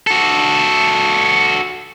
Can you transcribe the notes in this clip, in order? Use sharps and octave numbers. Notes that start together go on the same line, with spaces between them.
F#4 A4